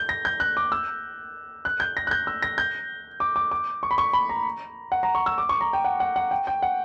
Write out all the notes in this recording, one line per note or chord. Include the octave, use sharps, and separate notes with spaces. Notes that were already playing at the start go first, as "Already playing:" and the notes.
Already playing: G6
A#6
G6
F#6
D6
E6
F#6
G6
A#6
F#6
G6
E6
A#6
G6
D6
D6
D6
C#6
B5
C#6
B5
A#5
F#5
A#5
C#6
E6
D6
C#6
A#5
G5
F#5
F#5
F#5
G5
G5
F#5